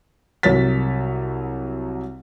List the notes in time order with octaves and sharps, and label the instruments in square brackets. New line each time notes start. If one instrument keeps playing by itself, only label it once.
[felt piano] C2 F#3 C#5 A6 B6